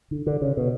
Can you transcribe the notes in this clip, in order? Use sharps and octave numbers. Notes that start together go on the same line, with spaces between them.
D3
D3
C#3
B2